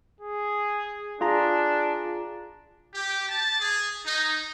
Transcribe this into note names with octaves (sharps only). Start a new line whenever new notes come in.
G#4
D4 F4 G#4 A#5
G4
A5
G#4
D#4